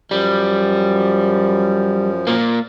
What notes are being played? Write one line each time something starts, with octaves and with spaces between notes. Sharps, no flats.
F#2 F3 G3
A#2 A#3